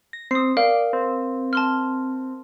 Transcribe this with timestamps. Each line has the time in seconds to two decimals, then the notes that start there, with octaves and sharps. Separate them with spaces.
0.13 A#6
0.31 C4 D#6 C7
0.57 A#4 D5 F5
0.93 C4
1.53 A5 C6 F6